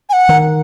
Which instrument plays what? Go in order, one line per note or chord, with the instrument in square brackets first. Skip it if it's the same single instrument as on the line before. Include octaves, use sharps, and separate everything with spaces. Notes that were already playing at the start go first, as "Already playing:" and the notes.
[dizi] G#5
F#5
[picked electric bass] D#3